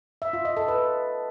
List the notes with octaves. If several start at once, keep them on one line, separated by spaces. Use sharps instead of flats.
E5
F4
D#5
A4
B4